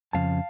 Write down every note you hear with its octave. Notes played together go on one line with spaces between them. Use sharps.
F2 C#3 F3 F5 A5